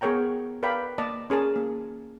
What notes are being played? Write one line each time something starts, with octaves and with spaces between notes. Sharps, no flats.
B3 G#4 A#4 C#5 G5 A#5
A#4 B4 D5 F5 G5 B5
A#3 D5 D#5 A5
C#4 G#4 A#4 A5
A#3